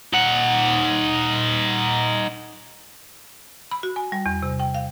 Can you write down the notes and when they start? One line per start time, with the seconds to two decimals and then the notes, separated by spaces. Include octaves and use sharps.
0.13 D#4 F#5
3.71 B5
3.83 F#4
3.96 G#5
4.12 G3
4.26 E2
4.42 C3
4.60 G5
4.75 F5